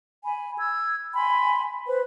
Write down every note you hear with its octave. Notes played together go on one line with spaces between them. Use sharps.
G#5 B5
E6 G#6
G5 G#5 B5 C6
B4 C5